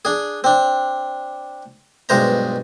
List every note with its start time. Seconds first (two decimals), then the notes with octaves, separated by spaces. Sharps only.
0.05 D4 G#4
0.44 C4 D4
2.09 B1 G2 G#3 C5 A#5